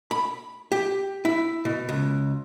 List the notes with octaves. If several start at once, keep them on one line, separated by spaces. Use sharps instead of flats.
B5
G4
E4
B2
C#2